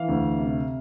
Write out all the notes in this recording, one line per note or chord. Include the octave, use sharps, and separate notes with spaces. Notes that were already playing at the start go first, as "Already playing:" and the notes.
Already playing: E3 F5
D2
C3